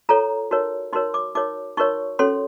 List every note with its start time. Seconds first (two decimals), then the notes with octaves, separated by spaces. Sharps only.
0.09 F4 A4 C#5 A#5
0.51 D#4 F#4 A#4 C#5
0.93 D#4 F#4 A#4 C#5 C6
1.14 D6
1.35 D#4 F#4 A#4 C#5 D6
1.77 D#4 F#4 A#4 C#5 C#6
2.19 C#4 F#4 A4 C#5 C6